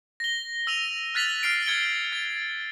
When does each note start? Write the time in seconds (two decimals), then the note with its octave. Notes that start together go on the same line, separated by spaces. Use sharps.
0.20 A#6 G7
0.67 E6 A#6 D#7 F7
1.14 F6 F#6 A6 B6 F7 F#7
1.43 F6 C7 D7
1.66 F6 G#6 A6 C#7 G7
2.12 A6